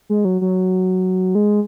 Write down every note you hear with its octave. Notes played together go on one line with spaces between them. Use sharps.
G#3
F#3
F#3
G#3